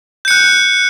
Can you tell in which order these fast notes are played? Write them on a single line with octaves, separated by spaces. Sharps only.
G6 C#7 F#6